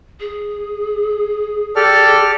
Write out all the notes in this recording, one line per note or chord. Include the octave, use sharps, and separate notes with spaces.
G#4
G4 A4 D5 F6